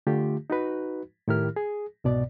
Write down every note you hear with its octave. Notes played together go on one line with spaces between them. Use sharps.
D3 A3 F4 G4
D#4 F#4 B4
A2 D#3 E4 G4 A#4 F6
G#4
C2 G#2 B2 B3 D5